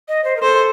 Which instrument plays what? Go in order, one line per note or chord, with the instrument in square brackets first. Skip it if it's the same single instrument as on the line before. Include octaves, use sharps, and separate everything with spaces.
[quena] D#5
C5
A#4
[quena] A4 [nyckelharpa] C5